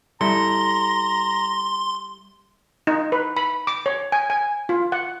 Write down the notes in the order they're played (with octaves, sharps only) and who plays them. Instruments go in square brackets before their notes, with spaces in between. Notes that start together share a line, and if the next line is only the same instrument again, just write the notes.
[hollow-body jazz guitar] G3 E4 A4 [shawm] A#5 [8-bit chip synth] C6
[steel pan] D#4
B4
B5
D6
C#5
G#5
G#5
F4
F#5